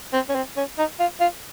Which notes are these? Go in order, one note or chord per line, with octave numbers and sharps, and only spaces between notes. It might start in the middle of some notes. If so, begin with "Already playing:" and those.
C4
C#4
C4
C#4
D#4
F4
F4